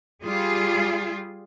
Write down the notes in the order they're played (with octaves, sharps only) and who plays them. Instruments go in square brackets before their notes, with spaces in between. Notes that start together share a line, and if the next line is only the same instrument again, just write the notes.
[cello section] G3 F4 G#4